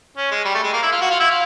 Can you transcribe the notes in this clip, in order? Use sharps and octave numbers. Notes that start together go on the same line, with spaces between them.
C#4
G#3
G3
A3
G#3
A#3
E4
F4
F#4
F4
E4
F4